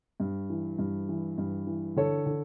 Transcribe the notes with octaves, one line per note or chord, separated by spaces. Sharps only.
G2
E3
G2
E3
G2
E3
D3 A4 C#5
D3